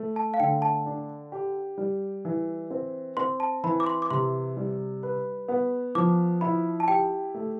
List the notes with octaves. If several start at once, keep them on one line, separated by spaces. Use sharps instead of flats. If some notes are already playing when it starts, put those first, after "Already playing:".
Already playing: A3
A5
F5
D3 G5
A5
D4
G4
G3
E3
C4
C4 C6
A5
E3 B5
D6
C6
D6
C3 C6
G3
B4
B3
F3 D6
E4 B5
A5
G4 G5
A3